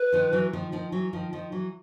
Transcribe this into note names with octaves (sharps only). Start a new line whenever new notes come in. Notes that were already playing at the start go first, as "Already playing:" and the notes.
Already playing: B4
D#3 F3
E3 F#3
D#3 F3
D#3 F3
E3 F#3
D#3 F3
D#3 F3
E3 F#3